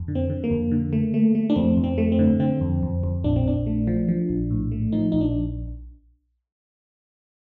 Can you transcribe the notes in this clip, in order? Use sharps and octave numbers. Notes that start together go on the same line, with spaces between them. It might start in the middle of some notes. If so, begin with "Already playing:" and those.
Already playing: F2
D3
C4
D3
A#3
F2
D3
A3
A3
A3
D4
F2 C4
F2
C4
A3
C4
D3
D3 C4
F2
F2
F2
A#1 D4
C4
A#1 D4
A3
F3
F3
A#1
A2
A3
F3 D#4
A#1 D#4
D4